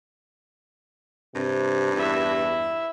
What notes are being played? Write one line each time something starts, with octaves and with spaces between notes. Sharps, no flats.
G2 C3
E2 E4 E5